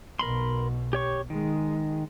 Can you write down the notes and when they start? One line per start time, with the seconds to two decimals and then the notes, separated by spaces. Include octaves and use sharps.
0.19 B1 B2 A#4 B5 C6
0.93 G4 C#5 C#6
1.30 D#3 G#3